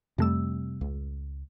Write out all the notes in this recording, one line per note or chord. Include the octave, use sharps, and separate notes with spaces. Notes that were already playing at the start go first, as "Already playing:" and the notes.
F2 C3 G3 A3 E6
C#2